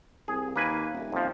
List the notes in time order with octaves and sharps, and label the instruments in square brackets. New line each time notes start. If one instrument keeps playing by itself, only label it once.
[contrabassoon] C2 [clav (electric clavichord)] G#4
[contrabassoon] D#2 [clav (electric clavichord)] A#3 B4 G#5
[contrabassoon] D#1
[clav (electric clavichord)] F2 F3